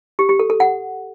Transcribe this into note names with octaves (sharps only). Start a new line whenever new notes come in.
G4
G4
A4
A4
F#5